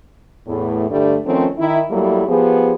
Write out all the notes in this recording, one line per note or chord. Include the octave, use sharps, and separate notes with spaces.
E2 A2
G2 D3 G3 A3
D#3 F3 A3 C4 C#4
D#3 E4
F#3 G3 A3 A#3 E4
F3 B3 G4 G#4